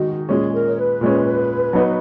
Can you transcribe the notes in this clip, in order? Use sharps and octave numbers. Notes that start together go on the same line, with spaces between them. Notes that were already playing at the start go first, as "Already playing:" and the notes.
Already playing: D#3 G#3 D#4 F#4
A#2 G#3 C#4 G#4
A#4
C#5
B4
A#2 G#3 C#4
F#3 B3 D#4 F#4